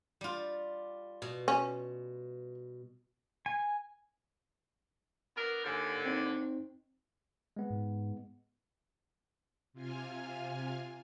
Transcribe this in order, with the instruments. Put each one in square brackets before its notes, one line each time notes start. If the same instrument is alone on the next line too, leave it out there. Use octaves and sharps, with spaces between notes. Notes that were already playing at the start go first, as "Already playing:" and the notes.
[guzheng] G3 F4
B2
[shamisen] C#4
[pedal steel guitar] G#5
[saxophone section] B3 D4 A#4
[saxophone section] D#2 D3 [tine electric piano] G#5 F6 G6
[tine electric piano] C4 D#4 C5
G#3 B3
[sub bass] G#2
[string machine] C3 F4 G#5 F6